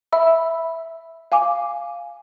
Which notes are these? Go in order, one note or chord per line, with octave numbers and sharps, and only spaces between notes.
E5 B5 E6
F5 G#5 D6